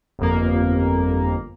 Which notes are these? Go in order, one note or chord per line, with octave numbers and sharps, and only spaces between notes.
G1 F2 A#3